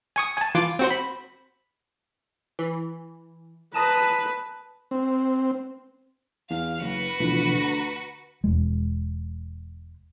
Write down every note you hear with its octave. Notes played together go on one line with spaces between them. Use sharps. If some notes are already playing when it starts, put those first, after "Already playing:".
G#5 C#6 D#6
G#5 A5
E3 F4 D6
C4 F#4 C5
B5
E3
B4 A5 A#5 D#6 E7
C4
E2 F5
F#1 F#4 B4
D2 B2 E3 F3
A#5
E1 G#3